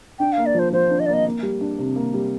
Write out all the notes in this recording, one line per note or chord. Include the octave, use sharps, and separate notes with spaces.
D4 G5
F5
A#3
D5
F3 C5
F3 C5
D4
D#5
A#3 D5
D#5
A#3
G3
D4
C3
A#3
G3